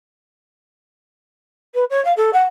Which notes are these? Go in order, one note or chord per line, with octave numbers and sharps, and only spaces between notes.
B4
C#5
F5
A4
F#5